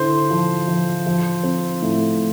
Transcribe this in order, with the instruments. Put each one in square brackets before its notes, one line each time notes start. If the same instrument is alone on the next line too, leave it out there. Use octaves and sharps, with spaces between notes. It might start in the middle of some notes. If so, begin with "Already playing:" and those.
Already playing: [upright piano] D3 E4 [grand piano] C5
[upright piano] F3
F3
F3
C4
A2